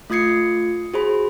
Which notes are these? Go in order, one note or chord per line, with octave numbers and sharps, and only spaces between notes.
A3 F4 D#6 G#6 C7 C#7
F#4 G#4 C5 B5